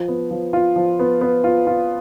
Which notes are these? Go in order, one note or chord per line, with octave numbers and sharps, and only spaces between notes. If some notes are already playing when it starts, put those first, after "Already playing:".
Already playing: F3
B3
F3
F4
F3
B3
B3
F4
F4